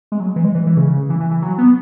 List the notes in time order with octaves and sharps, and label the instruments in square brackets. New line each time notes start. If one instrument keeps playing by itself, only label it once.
[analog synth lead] G#3
F#3
E3
G#3
E3
E3
C#3
E3
E3
E3
F#3
B3